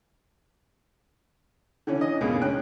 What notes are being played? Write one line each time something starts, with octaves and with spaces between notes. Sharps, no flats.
D3 E3 C#4
D#5
C#2 A#2 C#3 B3 G#4
C#4 G5 F#6